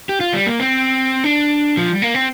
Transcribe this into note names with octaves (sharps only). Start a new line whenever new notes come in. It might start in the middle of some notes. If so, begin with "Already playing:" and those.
G4
F4
G3
A#3
C4
D4
F3
G3
A#3
C4